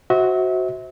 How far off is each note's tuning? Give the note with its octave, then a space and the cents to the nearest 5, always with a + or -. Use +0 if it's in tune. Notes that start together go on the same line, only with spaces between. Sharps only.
F#4 +0 C5 +0 E5 -35